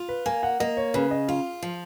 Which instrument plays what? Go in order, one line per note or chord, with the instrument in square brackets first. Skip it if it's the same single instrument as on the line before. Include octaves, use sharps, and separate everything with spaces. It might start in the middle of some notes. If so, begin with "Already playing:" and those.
Already playing: [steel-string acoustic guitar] F4
[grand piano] B4
[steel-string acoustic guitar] A#3 [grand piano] G#5
[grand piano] F#5
[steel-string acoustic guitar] A#3 [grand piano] D#5
[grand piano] C#5
[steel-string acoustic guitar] C#3 [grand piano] B4
[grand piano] D#5
[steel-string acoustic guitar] F4 [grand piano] F5
[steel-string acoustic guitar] F3